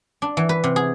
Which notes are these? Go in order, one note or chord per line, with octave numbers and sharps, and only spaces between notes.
D4
E3
B4
C3
G#4